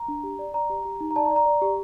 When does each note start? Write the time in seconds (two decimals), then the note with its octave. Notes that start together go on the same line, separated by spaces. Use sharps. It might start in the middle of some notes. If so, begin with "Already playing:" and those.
Already playing: A#5
0.08 D4
0.23 G4
0.39 D5
0.54 D5 A#5
0.70 G4
0.85 G4
1.00 D#4
1.11 A#5
1.16 D5 A5
1.26 A#5
1.31 D5
1.36 A#5
1.46 D5
1.62 G4